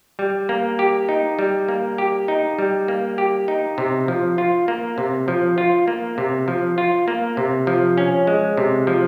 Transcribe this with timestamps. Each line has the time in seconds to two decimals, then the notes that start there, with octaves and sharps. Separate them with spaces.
0.19 G3
0.49 A#3
0.79 G4
1.09 D#4
1.39 G3
1.68 A#3
1.98 G4
2.28 D#4
2.58 G3
2.88 A#3
3.18 G4
3.48 D#4
3.78 C3
4.08 F3
4.38 F4
4.68 A#3
4.98 C3
5.28 F3
5.58 F4
5.88 A#3
6.18 C3
6.48 F3
6.78 F4
7.08 A#3
7.37 C3
7.67 F3
7.98 C#4
8.27 G#3
8.57 C3
8.87 F3